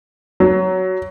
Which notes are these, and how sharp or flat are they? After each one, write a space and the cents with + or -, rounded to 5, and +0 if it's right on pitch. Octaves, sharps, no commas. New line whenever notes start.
F#3 +10